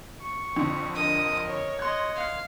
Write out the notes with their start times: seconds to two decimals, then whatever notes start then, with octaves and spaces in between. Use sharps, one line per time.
0.21 C#6
0.56 F2 D3
0.95 A#4 D#5 D#6
1.47 C#5
1.79 D#5 F#5 C6 G#6
2.16 F5